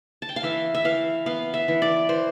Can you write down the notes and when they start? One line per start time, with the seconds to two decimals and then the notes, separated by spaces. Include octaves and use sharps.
0.22 A5
0.29 G5
0.36 F5
0.43 E3 E5
0.75 E5
0.85 E3 F5
1.26 B3 F5
1.54 E5
1.68 E3
1.82 D5
2.09 E3 C5